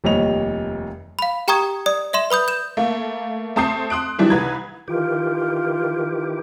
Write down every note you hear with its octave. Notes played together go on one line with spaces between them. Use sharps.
F1 D#2 G3 C#5 D#5 F7
F5 B5
G4 G5 A#5 C#6 D#6 G#6
D5 D#6
D5 E5 C6 E7
B4 B5 D#6 G6
G6 E7
A3 A#3
A3 C4 A5 D#6 G6 C7
C6 D#6 F#6 D7
D#3 E3 F#3 G3 D4 E4
C2 B4 G#6
D#3 E3 F4 G4